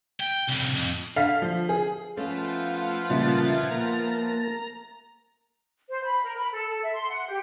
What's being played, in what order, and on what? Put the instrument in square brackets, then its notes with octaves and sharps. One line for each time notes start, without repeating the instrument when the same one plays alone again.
[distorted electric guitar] G5
C2 A2
F2
[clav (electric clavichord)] D3 [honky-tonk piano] F5 B6
[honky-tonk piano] F3
G#4
[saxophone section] F3 B3 F4 [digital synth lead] A3 [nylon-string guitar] C#4
[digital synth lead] A#2 [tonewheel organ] C#3 A5 A6 [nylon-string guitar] G3 A#3 E5
[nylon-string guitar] E5 [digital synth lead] G#6
[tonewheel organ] A#3 A5 [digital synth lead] A#5
[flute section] C5
B5
A#4
B5
A4
A4
E5
C6
F#5
G4